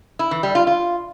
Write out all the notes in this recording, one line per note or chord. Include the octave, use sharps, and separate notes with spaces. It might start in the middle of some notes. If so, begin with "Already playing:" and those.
E4
E3
G3
F4
F4